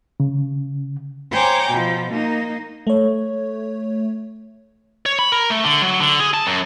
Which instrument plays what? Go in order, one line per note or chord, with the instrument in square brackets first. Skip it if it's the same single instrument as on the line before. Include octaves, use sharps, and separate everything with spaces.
[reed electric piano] C#3
[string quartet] C5 C#5 G5 G#5 A#5 D6
B2 F3
A#3 D#4
[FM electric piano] A3 C#5
[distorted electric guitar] C#5
B5
A#4
A3
D3
F#3
D3
G#4
A5
F#2